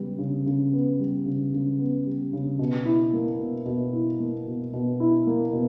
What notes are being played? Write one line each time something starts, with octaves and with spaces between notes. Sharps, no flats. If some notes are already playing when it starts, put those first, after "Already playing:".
Already playing: C#3 G3 B3
C#3
C#3
B3
G3
C#3
C#3
B3
G3
C#3
B2
E4
A#3
B2
B2
E4
A#3
B2
B2
E4
A#3
B2